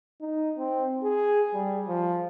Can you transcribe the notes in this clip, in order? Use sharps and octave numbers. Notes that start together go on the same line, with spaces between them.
D#4
C4
G#4
G3
F3